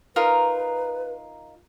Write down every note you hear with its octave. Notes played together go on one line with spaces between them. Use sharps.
D#4 F4 A#4 B4